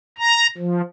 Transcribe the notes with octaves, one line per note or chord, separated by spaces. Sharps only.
A#5
F3